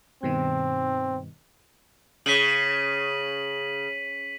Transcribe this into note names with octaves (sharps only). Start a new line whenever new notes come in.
G2 B2 D#3 C4
C#3 B6 D#7 F#7